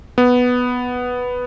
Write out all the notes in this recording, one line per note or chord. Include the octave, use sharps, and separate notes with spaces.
B3